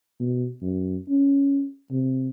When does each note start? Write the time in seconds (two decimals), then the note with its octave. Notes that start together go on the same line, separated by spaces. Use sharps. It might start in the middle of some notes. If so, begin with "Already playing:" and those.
0.20 B2
0.62 F#2
1.09 C#4
1.91 C3